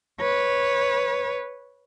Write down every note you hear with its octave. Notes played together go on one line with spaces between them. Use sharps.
B4 C#5